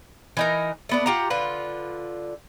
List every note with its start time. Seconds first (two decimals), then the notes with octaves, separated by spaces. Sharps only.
0.37 E3 D#4 A#4
0.89 A3 B3 D4
1.06 F4 G4 F#5 A#5
1.30 D3 F4 B4